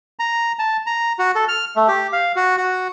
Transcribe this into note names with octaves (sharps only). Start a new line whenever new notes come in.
A#5
A5
A#5
F#4
A4
F6
A3
G4
F5
F#4
F#4